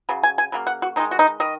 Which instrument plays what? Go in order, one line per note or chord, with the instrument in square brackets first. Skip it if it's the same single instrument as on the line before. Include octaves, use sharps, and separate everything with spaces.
[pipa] C#3 F#3
G#5
G#5
C#3 F#3 A#3
F#5
F#4
D#3 D#4
G#3
F#4
D#4
D#3 D#5